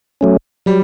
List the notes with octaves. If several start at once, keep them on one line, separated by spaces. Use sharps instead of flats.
F#3 A3 C#4
F#3 G3